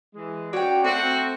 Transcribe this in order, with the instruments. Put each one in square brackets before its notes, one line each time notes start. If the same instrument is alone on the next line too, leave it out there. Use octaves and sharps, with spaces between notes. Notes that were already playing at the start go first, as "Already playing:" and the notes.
[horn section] E3 G#3
[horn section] F#2 D5 [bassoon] F#4 [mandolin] C#5 G5
[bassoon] A3 [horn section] C4 [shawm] F#4 [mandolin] C#6